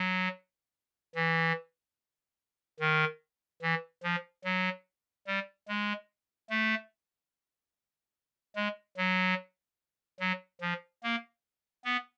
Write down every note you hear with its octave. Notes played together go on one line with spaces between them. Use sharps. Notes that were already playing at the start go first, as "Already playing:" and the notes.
Already playing: F#3
E3
D#3
E3
F3
F#3
G3
G#3
A3
G#3
F#3
F#3
F3
A#3
B3